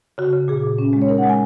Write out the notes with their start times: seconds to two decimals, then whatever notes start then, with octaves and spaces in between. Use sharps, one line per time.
0.18 C#3 F#4
0.33 C#3
0.48 A#2 G#4
0.64 A#2
0.78 C#4
0.93 G#3
1.02 C#5
1.08 D#4 A#4
1.18 F#5
1.24 G#3
1.29 G#5